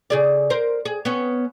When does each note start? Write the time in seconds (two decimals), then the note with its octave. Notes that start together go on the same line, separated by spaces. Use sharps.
0.10 C#3 G#4 D5
0.50 A#4 C5
0.85 G#4
1.05 B3 C#4